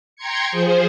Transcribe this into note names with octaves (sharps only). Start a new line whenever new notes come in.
G5 A#5 C6 G#6 C#7
F3 G#4 C5